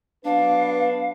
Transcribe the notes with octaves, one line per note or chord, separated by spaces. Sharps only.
F#3 B3 D4 B4 F5